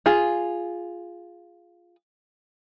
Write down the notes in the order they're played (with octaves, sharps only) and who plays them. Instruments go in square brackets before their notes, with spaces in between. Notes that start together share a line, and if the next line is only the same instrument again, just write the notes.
[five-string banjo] F4 G#4